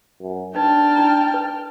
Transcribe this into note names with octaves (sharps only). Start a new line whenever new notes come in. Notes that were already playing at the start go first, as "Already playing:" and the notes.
F#2
D4 D#4 B4 G5 A5 F6
D#4 E4 A#5
B4